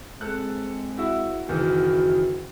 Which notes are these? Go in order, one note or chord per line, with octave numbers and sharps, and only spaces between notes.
G#3 C4 A4 F#6
E4 F#4 E5
F#1 D#3 E3 F#4